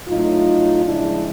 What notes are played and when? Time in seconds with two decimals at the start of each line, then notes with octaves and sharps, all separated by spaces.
0.08 A2 F#3 A3 D#4 F4
0.84 C#3 F3 G#3 D4 E4